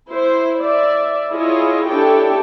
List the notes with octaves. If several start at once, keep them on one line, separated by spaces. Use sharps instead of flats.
E4 C5
D5 E5
E4 F4 G#4 C#5 D#5
D4 E4 G4 A4 C#5 G5